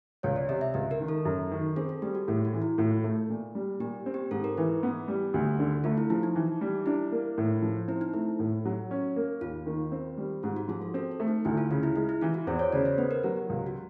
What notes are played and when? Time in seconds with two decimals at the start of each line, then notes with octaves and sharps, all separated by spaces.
0.23 C#2 C#5
0.36 D5
0.49 C3 D#5
0.61 E5
0.74 C#2 D#5
0.91 A#4
1.00 D#3
1.08 A4
1.25 F#2
1.52 D#3
1.76 C4 G#4
1.89 A4
2.02 G3 G4
2.15 F#4
2.28 A2 G#4
2.45 F#4
2.53 E3
2.62 E4
2.78 A2 F4
3.04 A3
3.29 A#2
3.55 G3
3.80 A#2 G4
4.06 C4
4.14 G4
4.31 G#2 A4
4.44 A#4
4.57 E3 B4
4.83 B3
5.08 G3
5.34 D2
5.59 D3
5.84 A3 F4
5.97 E4
6.10 F3 E4
6.23 D#4
6.36 E3
6.61 G3
6.86 D4 E4
7.12 A#3
7.38 A2
7.62 F3
7.88 C4 E4
8.01 D#4
8.14 A3 E4
8.39 A2
8.65 F#3
8.91 C#4
9.16 A#3
9.41 D#2 F4
9.66 D#3
9.92 C4
10.18 G3
10.43 G#2 F4
10.56 F#4
10.68 F3 G#4
10.82 A4
10.94 C4 A4
11.11 A4
11.20 A3
11.28 D#4
11.45 D2 E4
11.57 F4
11.71 C#3 F4
11.83 E4
11.96 G#3 E4
12.09 E4
12.21 E3 F4
12.34 F#4
12.47 E2 C5
12.59 C#5
12.72 C#3 D5
12.85 C5
12.98 B3 B4
13.11 A#4
13.24 F#3 A#4
13.36 G4
13.49 C#2
13.66 F#4